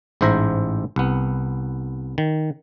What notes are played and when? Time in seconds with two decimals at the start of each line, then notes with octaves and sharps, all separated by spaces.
0.21 A1 G#2 E4 C5 E5 A#5
0.96 C2 B3
2.18 D#3